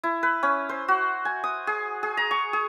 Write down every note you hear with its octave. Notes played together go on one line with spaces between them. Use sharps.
E4
B4
C#4
C5
F#4
G#5
D#6
G#4
G#4
A#5
C#6
G#4